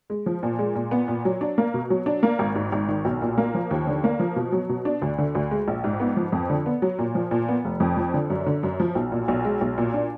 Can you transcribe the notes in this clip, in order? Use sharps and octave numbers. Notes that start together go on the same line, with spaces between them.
G#3
F3
A#2
G#3
A#2
B3
A#2
F#3
D4
A#3
B2
F#3
D4
A#3
G#1
G#2
G#1
D#3
B1
A#2
A#3
F3
D#2
D3
A#3
F3
B2
F#3
B2
D4
D2
D3
D2
G#3
A#1
G#2
B3
F3
F2
D3
B3
F#3
A#2
F3
A#2
B3
F1
F2
F3
D3
F#2
D3
F#2
F3
B1
A#2
B1
G#3
B1
A#2
D4